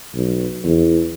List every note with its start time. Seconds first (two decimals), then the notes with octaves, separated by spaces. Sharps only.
0.14 B1
0.65 E2